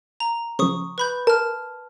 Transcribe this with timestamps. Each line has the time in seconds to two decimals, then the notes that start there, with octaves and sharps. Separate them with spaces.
0.20 A#5
0.59 C#3 F3 C#6 D#6
0.98 B4 B5 G6
1.27 A#4 A5 F6